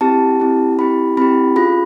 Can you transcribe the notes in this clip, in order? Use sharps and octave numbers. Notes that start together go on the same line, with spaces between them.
C4 E4 G4 A5
C4 E4 G4
C4 E4 G4 B5
C4 E4 G4 B5
C#4 F4 G#4 B5